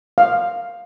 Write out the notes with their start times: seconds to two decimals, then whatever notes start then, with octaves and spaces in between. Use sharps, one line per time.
0.18 F5